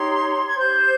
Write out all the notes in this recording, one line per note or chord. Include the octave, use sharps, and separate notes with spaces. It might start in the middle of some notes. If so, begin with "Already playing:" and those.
Already playing: D#4 G4 C#5 C6
G#6
G4 C5 G6